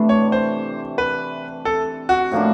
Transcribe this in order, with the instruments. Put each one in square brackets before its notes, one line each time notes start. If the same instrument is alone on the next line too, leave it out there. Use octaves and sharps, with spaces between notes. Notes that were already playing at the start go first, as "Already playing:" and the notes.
Already playing: [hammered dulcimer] C3 E3 A3 D4
[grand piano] C#5
C5
B4
A4
F#4
[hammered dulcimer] A2 F3 A#3 D4